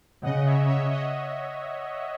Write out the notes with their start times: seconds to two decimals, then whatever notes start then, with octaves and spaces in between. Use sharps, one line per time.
0.23 C#3 D#5 F#5
0.46 C#5 E5
0.68 C#5 E5
0.91 D#5 F#5